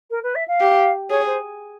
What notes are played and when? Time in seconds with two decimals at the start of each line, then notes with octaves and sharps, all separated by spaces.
0.10 A#4
0.23 B4
0.35 E5
0.47 F5
0.60 G4
1.09 G#4 C#5
1.26 C5